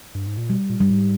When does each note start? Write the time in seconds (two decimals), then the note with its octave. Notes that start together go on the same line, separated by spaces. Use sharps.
0.15 G2
0.27 G#2
0.37 A#2
0.50 B2 G3
0.70 A#2
0.81 G2 G3
0.90 G#2